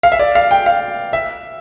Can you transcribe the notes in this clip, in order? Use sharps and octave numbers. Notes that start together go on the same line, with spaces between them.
F5
E5
D5
F5
G5
F5
E5